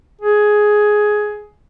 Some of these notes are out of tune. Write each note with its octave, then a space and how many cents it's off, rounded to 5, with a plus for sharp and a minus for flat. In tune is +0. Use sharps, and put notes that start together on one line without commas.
G#4 +10